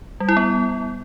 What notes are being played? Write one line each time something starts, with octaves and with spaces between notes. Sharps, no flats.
G3
E4
B3